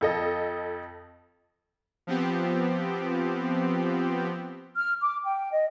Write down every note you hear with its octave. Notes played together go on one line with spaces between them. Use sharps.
F2 A4 D#5
F3 B3 C4 G4
F6
D6
G5
D#5